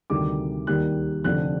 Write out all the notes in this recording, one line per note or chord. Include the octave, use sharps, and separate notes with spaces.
D2 C3 D#3 G3 D6
D#2 D#3 G3 F#6
F1 F2 D3 F3 F#6